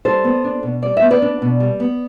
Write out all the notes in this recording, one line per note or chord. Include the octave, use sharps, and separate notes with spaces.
G3 A4 C5
B3
D4
B2
G3 D5
B3 E5
B4 D5
D4
B2
G3
B3